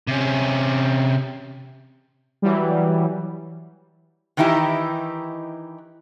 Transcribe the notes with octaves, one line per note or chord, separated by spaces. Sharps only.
C3 C#4
E3 F#3 G3
D#3 E3 D#4 E4 G4